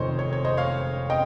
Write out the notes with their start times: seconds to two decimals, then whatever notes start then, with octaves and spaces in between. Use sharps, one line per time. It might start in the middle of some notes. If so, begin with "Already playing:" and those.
Already playing: F1 F2 D#3 C5 C#5 D#5
0.19 C#5
0.33 C#5
0.45 C5 D#5
0.57 C#5 F5
1.10 D#5 G5